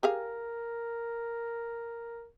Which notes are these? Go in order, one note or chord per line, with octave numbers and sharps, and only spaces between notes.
G4 G#4 A#4 F5